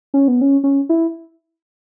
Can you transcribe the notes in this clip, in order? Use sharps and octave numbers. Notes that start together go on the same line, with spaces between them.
C#4
B3
C#4
C#4
E4